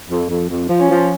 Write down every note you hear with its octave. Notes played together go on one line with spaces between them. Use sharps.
F2
F2
F2
F3
C#4
F3